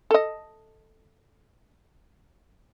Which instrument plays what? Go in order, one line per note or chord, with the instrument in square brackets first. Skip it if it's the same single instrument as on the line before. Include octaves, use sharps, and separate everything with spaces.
[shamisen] A4 D#5